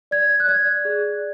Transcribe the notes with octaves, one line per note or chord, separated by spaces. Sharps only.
D5 G#6
F#6
D5 G#6
G#4